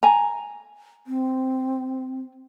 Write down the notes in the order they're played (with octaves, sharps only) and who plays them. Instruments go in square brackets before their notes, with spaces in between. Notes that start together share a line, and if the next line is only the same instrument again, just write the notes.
[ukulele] G#5 A#5
[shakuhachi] C4